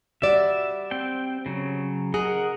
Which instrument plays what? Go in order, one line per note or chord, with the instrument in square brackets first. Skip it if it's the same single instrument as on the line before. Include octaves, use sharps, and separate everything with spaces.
[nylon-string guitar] G3 F#4 D5 [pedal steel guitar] E5
[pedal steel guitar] C4 G5
C#3 F#3
[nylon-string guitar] G#4 [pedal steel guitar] A#4 D#5 F#5